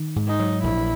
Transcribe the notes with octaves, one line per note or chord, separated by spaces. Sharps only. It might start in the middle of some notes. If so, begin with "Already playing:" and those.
Already playing: D#3
G#2
D#4
F#3
A#1 E4